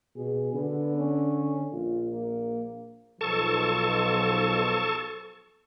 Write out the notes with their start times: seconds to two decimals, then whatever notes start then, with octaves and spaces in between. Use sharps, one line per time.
0.16 B2 G#4
0.53 D3 B3
0.96 C#4
1.73 A#1 F4
2.11 A#3
3.21 B1 F3 A4 A5 C#6